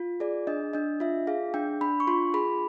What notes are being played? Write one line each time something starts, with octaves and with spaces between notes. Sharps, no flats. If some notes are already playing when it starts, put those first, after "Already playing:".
Already playing: F4
G#4 D5
D4 D#5
D4 D#5
F4 E5
G#4 F5
D4 G5
D4 B5
C#6
F4 C6
G#4 B5